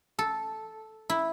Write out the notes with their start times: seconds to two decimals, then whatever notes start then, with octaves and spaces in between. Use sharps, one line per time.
0.19 A4
1.10 E4